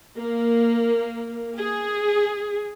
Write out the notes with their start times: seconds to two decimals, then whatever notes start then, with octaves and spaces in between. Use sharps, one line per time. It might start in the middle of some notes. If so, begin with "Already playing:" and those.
0.18 A#3
1.57 G#4